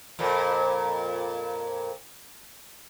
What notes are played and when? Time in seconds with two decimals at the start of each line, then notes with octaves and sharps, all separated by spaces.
0.19 F2 A#2